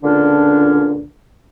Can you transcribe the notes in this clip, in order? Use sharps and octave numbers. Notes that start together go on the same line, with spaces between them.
C#2 A#2 D3 C#4 D4